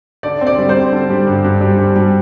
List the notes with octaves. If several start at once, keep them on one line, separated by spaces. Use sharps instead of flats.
D3 D5
C4
D5
G3
C5
C4
D3
G3
G2
G2
G3
G3
G3